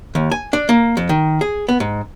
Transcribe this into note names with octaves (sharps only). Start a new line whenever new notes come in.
D#2
G#5
D4
A#3
F2
D#3
G#4
B3
G#2